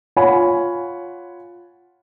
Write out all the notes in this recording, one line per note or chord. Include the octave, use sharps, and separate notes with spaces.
F4 C#5 F#5 G#5 B5